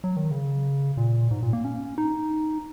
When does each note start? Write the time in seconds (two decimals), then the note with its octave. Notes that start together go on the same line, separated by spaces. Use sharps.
0.04 F#3
0.16 D#3
0.31 C#3
0.97 A#2
1.31 G#2
1.43 A#2
1.53 A#3
1.64 C#4
1.98 D#4